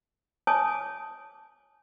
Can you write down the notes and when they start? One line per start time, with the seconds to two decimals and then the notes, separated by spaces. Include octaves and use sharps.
0.47 C#5 G#5 A5 D6 D#6